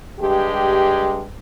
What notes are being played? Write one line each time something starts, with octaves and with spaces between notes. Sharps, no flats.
G2 G#3 G4